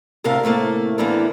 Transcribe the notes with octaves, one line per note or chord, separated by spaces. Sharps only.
D2 A2 C3 A#4 F5 A5
A2 C3 A3 A#3
D2 A2 D3 E3 A#3 B3